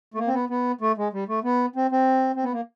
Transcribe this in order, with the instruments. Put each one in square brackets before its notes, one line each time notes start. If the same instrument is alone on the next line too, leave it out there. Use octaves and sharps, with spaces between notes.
[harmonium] A3
A#3
C4
B3
B3
A3
G#3
G3
A3
B3
C4
C4
C4
B3
A#3